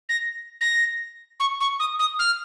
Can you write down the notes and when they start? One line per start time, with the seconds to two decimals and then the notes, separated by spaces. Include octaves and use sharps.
0.09 A#6
0.61 A#6
1.40 C#6
1.60 C#6
1.80 D#6
1.99 D#6
2.19 F6